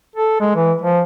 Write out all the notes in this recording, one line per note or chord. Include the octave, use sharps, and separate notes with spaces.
A4
G#3
E3
F3